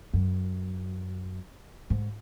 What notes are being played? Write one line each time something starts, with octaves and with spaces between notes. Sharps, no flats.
F#2
G#2